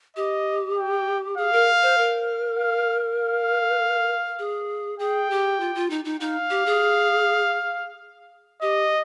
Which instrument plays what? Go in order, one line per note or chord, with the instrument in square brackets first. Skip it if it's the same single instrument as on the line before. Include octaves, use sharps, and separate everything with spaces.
[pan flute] G4 [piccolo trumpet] D#5
[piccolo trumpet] G5
[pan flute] G#4 [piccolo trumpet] F5
[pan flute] A#4
C5
A#4
[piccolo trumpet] F5
F5
[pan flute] G#4
[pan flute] G#4 [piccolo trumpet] G5
[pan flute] G4
F4
F4
D#4
D#4
[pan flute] D#4 [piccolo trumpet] F5
[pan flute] G4
G#4
[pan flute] G4 [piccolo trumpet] D#5